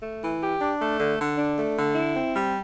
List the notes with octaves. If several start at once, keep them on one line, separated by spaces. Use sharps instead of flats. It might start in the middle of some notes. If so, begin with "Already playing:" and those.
A3
E3
G4
D4
A3
D3
D3
D4
A3
D3
E4
C4
G3